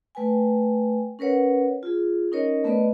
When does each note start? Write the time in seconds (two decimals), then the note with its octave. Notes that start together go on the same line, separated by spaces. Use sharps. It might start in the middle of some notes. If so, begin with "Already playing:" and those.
0.15 A3 B4 G5 G#5
1.19 C#4 A#4 B4 C#5 F#5
1.83 F4 G#4
2.32 C#4 D#4 A#4 C#5 D#5
2.64 A3 B3 B4 D5 D#5